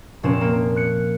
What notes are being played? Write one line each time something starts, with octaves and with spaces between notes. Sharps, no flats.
F1 A#2 C4 C#4 C5 E7
A#3 D7
F#6 C#7